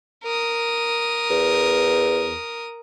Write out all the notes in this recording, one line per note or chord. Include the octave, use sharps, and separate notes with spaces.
A#4 D#6
E2